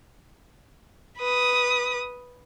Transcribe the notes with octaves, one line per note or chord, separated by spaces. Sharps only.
B4 D#6